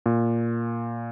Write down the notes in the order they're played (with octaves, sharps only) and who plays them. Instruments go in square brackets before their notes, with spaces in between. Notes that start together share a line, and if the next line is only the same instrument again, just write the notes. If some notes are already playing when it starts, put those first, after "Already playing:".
[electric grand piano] A#2